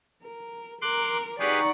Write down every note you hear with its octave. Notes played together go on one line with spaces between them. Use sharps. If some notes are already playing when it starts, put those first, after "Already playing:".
A#4
A#4 C6 D6 F#6
D#4 G4 G#4 B4 D5 F#5 C#6